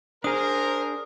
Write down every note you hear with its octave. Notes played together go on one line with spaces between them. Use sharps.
D4 G#4 A#4 C5 D#6